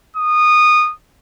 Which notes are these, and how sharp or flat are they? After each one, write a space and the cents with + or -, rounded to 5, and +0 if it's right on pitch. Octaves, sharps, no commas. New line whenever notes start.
D#6 -20